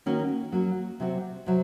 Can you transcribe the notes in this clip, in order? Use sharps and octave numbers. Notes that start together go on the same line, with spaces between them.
D#3 A#3 C#4 F#4
F#3 A#3 C#4 F#4
C3 F#3 C4 F#4
C3 F#3